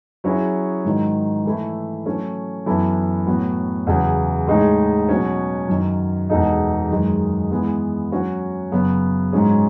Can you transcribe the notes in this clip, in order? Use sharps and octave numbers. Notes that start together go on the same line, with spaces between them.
F#3 C#4 E4 G#4
G#2 D#3 F#3
E3 A3 E4
F#3 A3 C#4
F#2 E3 B3 E4 A4
A2 F#3 B3
E2 C#3 F#3
A2 G#3 D#4 G#4
B2 F#3 C#4
F#2 D#3 F#3
E2 B2 G#3 D#4 A4
F#2 D#3 G#3
E3 G#3 B3
F#3 C#4 F#4
F#2 C#3 F#3 B3
G#2 F#3 C#4 G#4